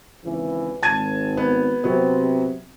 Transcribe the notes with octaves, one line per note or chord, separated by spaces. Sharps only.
G#1 C#3 E3
G#1 A5 G#6 D#7
B3
C3 F#3 B3